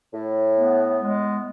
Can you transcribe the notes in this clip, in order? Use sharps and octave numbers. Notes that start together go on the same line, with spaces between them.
A2
B3
G#3